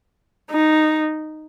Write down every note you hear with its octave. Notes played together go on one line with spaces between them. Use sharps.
D#4